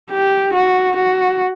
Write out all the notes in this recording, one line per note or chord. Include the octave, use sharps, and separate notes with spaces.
G4
F#4
F#4